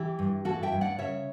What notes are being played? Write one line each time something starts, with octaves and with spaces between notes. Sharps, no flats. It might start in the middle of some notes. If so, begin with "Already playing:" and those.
Already playing: E3 E4 G4
G2
E3 F#4 A4
E5 G5
G2
D5 F#5
C#3 C#5 E5